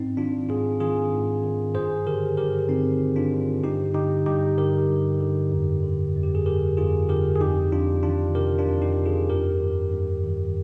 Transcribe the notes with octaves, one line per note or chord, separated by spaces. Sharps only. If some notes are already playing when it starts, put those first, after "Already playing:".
Already playing: G#2 C4 D#4
D#3 D4 F4
G#2 F4 G#4
D#3 F4 G#4
G#2
D#3
G2 G#4 C5
D3 G4 A#4
G2 G4 A#4
D3 C4 D#4
G2
D4 F4
D3
G2 D#4 G4
D3 D#4 G4
G2 D#4 G4
D3 G4 A#4
G2
D3
F2
D3
F2
G4
G#4
D3 G4 A#4
F2 F4 G#4
D3 G4 A#4
G#4
F2 D#4 G4
F2 D4 F4
D#3 D4 F4
C3 G4 A#4
D4 F4
F2
D#4 G4
F2
F4 G#4
G2 G4 A#4
D#3
G2
D#3